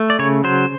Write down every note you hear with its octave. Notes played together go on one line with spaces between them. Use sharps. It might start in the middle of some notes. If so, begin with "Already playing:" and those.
Already playing: A3
D5
C#3 C#5
F#3 C5